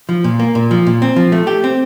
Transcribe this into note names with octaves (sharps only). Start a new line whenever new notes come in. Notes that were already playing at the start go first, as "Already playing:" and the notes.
F3
A#2
A#3
A#2
F3
A#2
C4
F3
A3
G4
C4